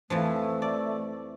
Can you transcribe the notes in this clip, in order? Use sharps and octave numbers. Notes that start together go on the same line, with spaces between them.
F2 E3 F3 A3
D5